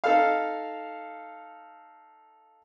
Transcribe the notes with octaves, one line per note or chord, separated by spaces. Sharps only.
D#4 A4 F5